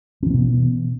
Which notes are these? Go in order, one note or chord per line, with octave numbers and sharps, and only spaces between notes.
B2 E3 B3 C4